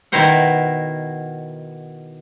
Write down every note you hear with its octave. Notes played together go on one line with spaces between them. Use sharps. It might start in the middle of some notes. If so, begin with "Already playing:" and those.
B2 D#3 E4 A#4 C5 F#5